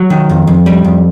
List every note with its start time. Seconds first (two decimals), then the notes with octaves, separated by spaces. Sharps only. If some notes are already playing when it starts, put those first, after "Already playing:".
Already playing: F#3
0.10 D#3
0.29 F2
0.47 F2
0.66 G3
0.84 F2